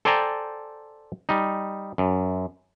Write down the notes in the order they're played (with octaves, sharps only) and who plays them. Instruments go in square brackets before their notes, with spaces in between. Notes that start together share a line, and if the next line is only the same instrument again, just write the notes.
[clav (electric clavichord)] A4 C5 D5 G5 G#5 A#5
G3 D#4
F#2